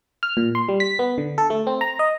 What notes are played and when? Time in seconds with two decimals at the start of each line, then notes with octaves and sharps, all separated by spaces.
0.23 F6
0.37 A#2
0.55 C6
0.69 G3
0.80 B6
0.99 B3
1.18 D3
1.38 A4
1.50 A3
1.67 C4
1.81 A#5
1.99 D#5